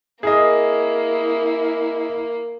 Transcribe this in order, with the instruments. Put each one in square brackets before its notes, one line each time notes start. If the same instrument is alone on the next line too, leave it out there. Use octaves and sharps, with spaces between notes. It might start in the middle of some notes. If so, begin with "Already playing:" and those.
[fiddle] A#3 [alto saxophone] E4 [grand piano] G#4 A#4 D#5